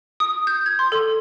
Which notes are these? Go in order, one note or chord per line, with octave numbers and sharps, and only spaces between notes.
D#6
G6
G#6
C6
A4